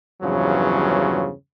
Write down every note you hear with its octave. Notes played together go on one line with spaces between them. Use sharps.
E2 G2 C#3 F3 F#3